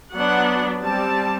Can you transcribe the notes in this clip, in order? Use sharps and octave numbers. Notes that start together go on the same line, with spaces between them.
F#3 B3 D4 F#5
G3 C4 A5